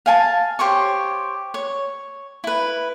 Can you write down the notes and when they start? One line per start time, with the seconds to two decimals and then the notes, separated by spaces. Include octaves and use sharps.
0.06 F5 G#5 A5
0.59 G4 C5 C#5 C#6
1.54 C#5
2.44 E4 B4